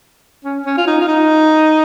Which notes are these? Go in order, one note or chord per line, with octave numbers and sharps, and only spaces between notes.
C#4
C#4
F4
D#4
F4
D#4